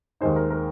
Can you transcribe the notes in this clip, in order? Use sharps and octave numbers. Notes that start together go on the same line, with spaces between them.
D#2 D#3 G#3 D#4 C5
A#4
A#4